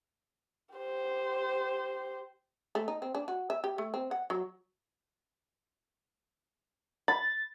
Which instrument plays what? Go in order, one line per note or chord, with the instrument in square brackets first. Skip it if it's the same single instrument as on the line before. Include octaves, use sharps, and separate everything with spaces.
[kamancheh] G4 C5
[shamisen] A3
D#4
C4
D4
F#4
E5
G4
A3
C4
F#5
F#3
[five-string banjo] B5 [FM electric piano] A6